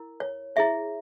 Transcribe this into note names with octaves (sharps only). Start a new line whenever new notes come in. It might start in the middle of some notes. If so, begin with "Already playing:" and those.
Already playing: E4 A#4
C#5
E4 G#4 C#5 E5